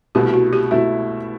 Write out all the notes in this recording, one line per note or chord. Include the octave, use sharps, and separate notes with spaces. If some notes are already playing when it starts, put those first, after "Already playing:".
C2 B2 A3 E4 G4
F#4
G4
B2 A3 E4 F#4